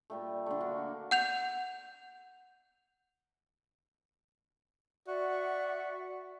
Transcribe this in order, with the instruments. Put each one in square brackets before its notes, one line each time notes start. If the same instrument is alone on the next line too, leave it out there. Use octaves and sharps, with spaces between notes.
[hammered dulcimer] A#2 G3 A3
D3 A3
A#3 D4 F#4
[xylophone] F#5 G6 F7
[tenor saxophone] F#4 [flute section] D5 E5 F#5